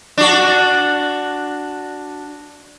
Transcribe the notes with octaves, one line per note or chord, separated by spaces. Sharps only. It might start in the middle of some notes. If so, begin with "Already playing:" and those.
D4 F#4